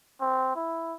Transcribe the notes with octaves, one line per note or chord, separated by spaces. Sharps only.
C4
E4